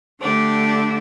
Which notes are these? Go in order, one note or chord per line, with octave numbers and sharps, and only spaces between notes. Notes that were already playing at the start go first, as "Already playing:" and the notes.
D3 A3 D4 G4